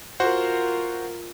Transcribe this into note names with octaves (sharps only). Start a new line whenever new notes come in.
F4 F#4 A#4 C5 F#5